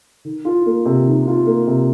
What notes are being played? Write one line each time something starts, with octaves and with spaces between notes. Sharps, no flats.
D#3
F4
A#3
C3
D#3
F4
A#3
C3